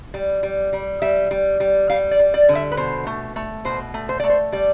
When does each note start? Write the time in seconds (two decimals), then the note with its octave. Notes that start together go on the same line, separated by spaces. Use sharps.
0.14 G3
0.43 G3
0.73 G3
1.02 G3 E5
1.31 G3
1.60 G3
1.90 G3 F5
2.11 D5
2.19 G3
2.34 D5
2.49 D3
2.55 E5
2.72 B4
2.77 B2 C5
3.07 A3
3.36 A3
3.65 B2 C5
3.94 A3
4.09 C5
4.20 A3 D5
4.30 C5
4.52 G3 D5